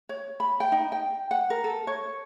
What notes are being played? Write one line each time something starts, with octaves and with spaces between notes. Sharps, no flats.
C#5
B5
G5
D#4
G5
F#5
A#4
A4
C#5